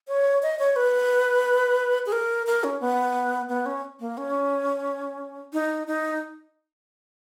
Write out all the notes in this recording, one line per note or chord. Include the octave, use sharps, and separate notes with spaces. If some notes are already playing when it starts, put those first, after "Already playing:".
C#5
D#5
C#5
B4
G#4
A#4
A#4
C#4
B3
B3
C#4
A#3
C#4
D#4
D#4